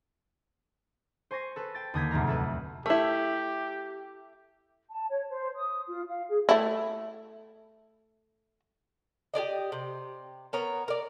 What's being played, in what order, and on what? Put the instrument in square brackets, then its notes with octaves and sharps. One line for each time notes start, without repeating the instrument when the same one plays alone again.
[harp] C5 G#5 C#6 A#6 C7
A4 B4
G5 A6
D#2 D3 D#6 G6 G#6 B6
F1 D2 G#2 F#3 A#5 F6
A3 A4 B4
[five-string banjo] A3 E4 [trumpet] G4
[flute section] A5
C#5
C5
D#6
F4
F5
G#4
[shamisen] A3 E4
[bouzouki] G4 G#4 D5 D#5
C3
B3 A#4 C#5 A#5
A#4 D5